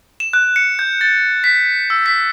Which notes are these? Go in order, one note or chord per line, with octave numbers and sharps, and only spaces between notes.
E7
F#6
C#7
G6
A6
B6
E6
B6